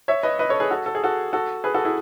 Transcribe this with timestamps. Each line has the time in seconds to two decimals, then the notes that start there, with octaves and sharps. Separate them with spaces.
0.08 C#5 E5
0.23 B4 D#5
0.39 B4 D#5
0.49 A4 C#5
0.60 G#4 B4
0.70 F#4 A4
0.86 A4
0.95 G#4
1.04 F#4 A4
1.33 F#4 A4
1.64 G#4 B4
1.74 F#4 A4
1.85 E4 G#4